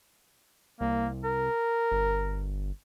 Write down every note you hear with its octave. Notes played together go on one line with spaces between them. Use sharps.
C2 A#3
A#4
G1